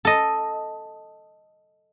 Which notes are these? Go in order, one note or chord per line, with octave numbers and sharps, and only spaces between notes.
A4 D#5